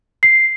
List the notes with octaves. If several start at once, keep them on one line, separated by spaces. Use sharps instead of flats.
C7